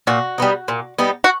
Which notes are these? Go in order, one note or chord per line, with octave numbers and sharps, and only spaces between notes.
A#2 F#4
G3 B3 D#4
A#2
G3 B3 D#4
F#4